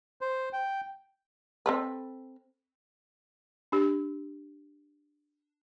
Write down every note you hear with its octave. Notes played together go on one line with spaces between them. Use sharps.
C5
G5
C4 A4 B4
D4 G4